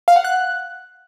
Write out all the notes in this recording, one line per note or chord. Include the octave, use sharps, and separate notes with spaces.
F5
F#5
F#6